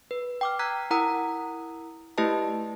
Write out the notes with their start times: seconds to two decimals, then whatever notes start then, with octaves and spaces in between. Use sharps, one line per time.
0.11 B4
0.41 G5 D6 F6
0.59 A#5 E6 F#6 G#6 B6
0.91 E4 A#4 F#5 A#5 D#6 E6
2.18 A3 E4 G4 B4 D#5 A5